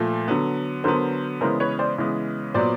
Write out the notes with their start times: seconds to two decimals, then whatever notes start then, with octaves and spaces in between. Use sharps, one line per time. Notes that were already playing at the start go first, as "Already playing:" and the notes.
Already playing: A#2 F3 A3
0.28 D3 F#3 B3
0.84 D3 F#3 B3 A#4 C5
1.41 C#3 E3 G#3 B3 A#4 C5
1.60 B4 C#5
1.79 C5 D5
1.98 C#3 E3 G#3 B3
2.54 A#2 F#3 B3 C5 D5